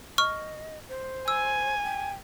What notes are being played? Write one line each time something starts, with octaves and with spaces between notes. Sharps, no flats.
D#5 C#6 F6
C5
G#5 E6
G5